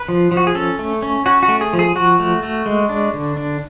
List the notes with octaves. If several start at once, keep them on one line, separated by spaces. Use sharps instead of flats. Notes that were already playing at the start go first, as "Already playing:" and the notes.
Already playing: B4
F3
F3
F#4
G#4
C#4 A4
A3
C#4
C#4 F#4
F#4
A3
G#4
F3
G#4
F3 F#4
A3
A3
G#3
D4
D3
D4